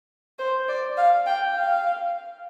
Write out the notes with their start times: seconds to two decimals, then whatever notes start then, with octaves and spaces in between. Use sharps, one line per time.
0.39 C5
0.68 D5
0.97 F5
1.26 G5
1.54 F5